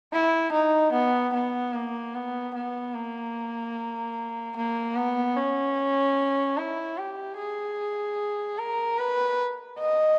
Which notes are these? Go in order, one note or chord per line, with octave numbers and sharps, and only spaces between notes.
E4
D#4
B3
B3
A#3
B3
B3
A#3
A#3
B3
C#4
E4
G4
G#4
A#4
B4
D#5